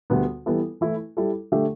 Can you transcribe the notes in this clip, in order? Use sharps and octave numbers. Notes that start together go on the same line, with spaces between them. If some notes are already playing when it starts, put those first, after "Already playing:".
D2 D3 G3 B3
E3 G3 B3 E4 A4
E3 A3 E4
G3 E4 A4
D3 A3 G4 E5